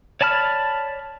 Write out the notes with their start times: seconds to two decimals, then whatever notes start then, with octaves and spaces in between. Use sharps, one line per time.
0.21 C#5 D5 A5 B5 F6